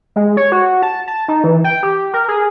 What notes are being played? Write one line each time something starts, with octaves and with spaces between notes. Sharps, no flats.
G#3
C#5
F#4
A5
A5
D#4
E3
G5
G4
A#4
G#4